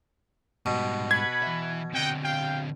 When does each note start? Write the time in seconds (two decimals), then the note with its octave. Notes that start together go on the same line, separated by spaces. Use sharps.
0.66 G#2 B2 G3
1.11 B4 F#5 B5 G#6
1.43 E3 E5
1.93 D3 C4 D#5 F#5 G5
2.23 F5 G5